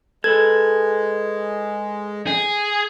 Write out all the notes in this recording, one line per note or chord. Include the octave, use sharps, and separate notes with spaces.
G#3 A4 B4 G#6
G#4